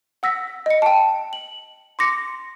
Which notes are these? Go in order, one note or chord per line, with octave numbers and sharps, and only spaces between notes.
F#5 E6 A#6 B6
D#5 C#7
G5 A5
F#7
C6 D6 A#6 C#7